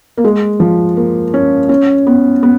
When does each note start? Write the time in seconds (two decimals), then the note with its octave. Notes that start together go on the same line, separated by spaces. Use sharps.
0.18 A#3
0.24 G#3
0.60 F3
0.97 A#3
1.34 C#4
1.69 C#4
2.07 B3
2.43 B3